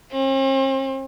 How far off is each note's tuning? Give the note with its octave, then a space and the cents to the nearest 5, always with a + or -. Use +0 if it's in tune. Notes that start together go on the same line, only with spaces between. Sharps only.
C4 +45